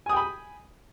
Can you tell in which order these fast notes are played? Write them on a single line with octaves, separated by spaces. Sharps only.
G#5 D#6 G5 B5